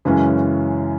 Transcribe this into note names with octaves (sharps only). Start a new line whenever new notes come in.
F#2 C#3 E3 G#3 C#4